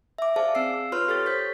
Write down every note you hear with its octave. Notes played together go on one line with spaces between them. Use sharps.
E5 D6
G#4 C5 D5 F5 A5
C4 F5 E6 C7
F4 B4 C#5 C6 F6
G4 A4 C#5 A6
C5 G6 B6